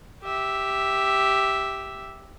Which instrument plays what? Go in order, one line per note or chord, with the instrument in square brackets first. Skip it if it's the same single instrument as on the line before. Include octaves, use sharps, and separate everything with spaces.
[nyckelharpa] G4 E5